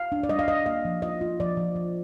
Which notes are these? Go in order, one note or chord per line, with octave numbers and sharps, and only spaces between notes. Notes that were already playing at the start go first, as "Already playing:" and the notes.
Already playing: F5
D4
D5
G3 D#5
F5
G3 D#5
A#3 F5
F3
F4 D#5
F4
F3 D5
F3
F3